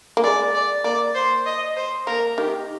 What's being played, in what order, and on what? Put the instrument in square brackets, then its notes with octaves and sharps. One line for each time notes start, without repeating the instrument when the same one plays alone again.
[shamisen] A#3
[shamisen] G#3 [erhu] D5
[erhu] D5
[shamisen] A#3 [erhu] D5
[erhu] C5
D#5
C5
[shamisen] A#3 [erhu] A#4
[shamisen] D#3 [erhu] G4